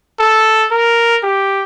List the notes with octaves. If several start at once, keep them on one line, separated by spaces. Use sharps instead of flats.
A4
A#4
G4